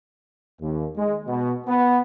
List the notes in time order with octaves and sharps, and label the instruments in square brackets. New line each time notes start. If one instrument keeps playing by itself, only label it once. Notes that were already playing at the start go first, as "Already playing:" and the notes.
[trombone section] D#2
G#3
B2
B3